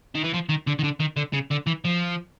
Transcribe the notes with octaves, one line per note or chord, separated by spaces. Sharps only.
D#3
E3
F3
D#3
D3
D#3
D3
D#3
D3
C#3
D3
E3
F3